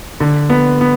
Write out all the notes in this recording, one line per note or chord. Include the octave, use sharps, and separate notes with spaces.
D3
B3
B3